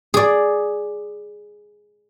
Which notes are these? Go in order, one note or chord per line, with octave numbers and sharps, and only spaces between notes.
G#4 D5